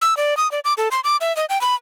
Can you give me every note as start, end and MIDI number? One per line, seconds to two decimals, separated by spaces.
0.02 0.17 88
0.17 0.37 74
0.37 0.50 87
0.52 0.60 74
0.65 0.74 86
0.78 0.88 69
0.91 1.00 84
1.04 1.17 86
1.21 1.35 76
1.37 1.45 75
1.49 1.60 79
1.61 1.75 83